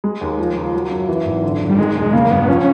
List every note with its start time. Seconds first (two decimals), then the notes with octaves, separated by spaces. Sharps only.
0.04 G#3
0.21 D#2
0.39 F3
0.56 C#2
0.74 F#3
0.91 F#2
1.09 E3
1.25 G#1
1.44 D3
1.60 F#1
1.69 G3
1.78 D#3 G#3
1.96 E1
2.13 C#3 A#3
2.31 G1 B3
2.49 F3 C#4